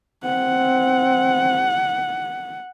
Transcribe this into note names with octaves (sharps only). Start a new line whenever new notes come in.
C4 F#5